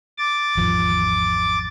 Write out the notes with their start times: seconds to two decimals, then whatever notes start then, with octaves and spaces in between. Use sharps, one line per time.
0.18 D6 A6
0.57 G#1 E2 F3